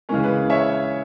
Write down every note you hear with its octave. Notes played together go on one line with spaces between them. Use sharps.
C#3 E3 G#3 C#4 A#4
B4
C#5 E5